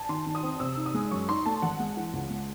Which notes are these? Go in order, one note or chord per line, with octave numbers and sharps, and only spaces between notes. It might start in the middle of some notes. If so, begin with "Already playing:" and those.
Already playing: G#5 A5
D#3 C6
D#3
D#6
C4
C3 E6
D#4
D#6
G#3
F#2 C#6
D#4 C6
A3 A5
G#1 F#5
G#3
E3
C#2
G#3